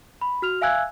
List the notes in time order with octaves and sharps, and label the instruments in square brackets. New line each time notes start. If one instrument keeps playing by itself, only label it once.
[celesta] B5
F#4 F6 F7
E5 F5 G#5 E6 F#6 G#6